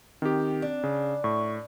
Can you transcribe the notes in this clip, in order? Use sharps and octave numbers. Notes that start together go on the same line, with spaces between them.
D#3 C4 G4
D4
C#3
A2 C#6